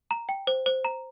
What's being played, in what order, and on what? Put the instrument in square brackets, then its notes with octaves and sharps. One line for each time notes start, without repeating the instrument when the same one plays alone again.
[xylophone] A#5
G5
C5
C5
A#5